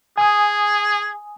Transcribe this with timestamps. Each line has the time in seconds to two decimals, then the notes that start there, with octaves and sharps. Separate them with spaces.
0.18 G#4 G#5 D#6